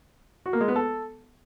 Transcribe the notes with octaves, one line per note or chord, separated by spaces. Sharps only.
F#4
A#3
G#3
B3
A4